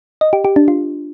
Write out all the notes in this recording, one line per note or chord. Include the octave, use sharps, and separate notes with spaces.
D#5
G4
G4
D4
F4